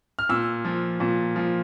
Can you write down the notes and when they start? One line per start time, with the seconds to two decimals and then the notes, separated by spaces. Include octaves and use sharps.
0.19 F6
0.29 A#2 E6
0.65 F3
1.00 A#2
1.36 F3